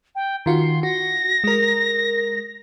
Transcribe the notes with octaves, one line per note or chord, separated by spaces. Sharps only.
G5
D#3 F4 F#4 C6
F#4 A#6
G#3 A#4